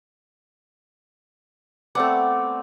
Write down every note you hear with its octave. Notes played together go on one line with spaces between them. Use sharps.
A3 B3 C4 D5 F#5 G5